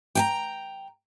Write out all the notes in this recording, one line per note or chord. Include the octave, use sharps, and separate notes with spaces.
G5 G#5 A#5